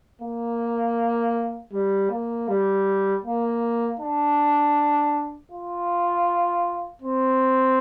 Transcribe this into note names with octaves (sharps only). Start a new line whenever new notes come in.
A#3
G3
A#3
G3
A#3
D4
F4
C4